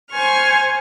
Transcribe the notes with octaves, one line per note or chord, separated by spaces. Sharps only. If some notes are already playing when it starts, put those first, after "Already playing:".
C5 G#5 C#6 F6